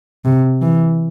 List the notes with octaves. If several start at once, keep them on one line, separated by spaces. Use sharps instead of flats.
C3
E3